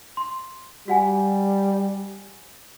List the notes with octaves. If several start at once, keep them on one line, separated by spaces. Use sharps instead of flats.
C6
G3 F#4 F#5 G#5